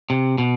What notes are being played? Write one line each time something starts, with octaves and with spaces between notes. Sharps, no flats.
C3
B2